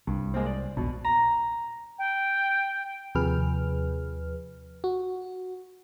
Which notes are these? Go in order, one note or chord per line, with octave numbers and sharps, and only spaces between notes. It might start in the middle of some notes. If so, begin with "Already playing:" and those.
C2 G2
G#3 A#3 C4
D5
E1 A#1 B2
A#5
G5
D#2 C3 F3 G#4 B4 F6
F#4